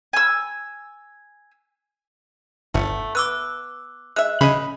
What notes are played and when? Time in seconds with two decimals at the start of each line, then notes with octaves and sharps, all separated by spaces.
0.13 G#5 E6
2.74 G1 A3 F#5
3.15 B3 D6 E6 F#6
4.16 G#3 E5 F#6
4.41 C#3 D#5 B5